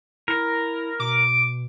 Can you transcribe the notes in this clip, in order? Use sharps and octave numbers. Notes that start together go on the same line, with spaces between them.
E4 A#4
B2 D6